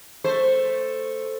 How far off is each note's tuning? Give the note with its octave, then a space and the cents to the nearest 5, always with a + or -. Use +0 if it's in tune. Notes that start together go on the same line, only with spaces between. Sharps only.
A3 +0 C5 +0